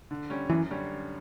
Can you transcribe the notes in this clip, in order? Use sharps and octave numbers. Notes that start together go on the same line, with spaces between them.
D3
G3 C#4
F#2 E3
D3 G3 C#4